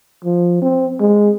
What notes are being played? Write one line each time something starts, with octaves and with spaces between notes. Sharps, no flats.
F3
C4
G#3